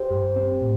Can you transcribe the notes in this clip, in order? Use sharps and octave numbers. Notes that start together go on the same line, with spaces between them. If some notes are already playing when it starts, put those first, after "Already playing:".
Already playing: G4 C5
G2
C4
A2